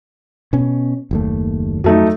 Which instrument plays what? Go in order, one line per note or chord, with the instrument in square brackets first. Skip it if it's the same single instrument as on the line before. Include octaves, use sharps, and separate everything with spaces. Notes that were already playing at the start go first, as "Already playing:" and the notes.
[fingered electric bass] B2 C#4
F#1 D#2 A3
[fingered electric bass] F2 [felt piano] F#3 A3 D#4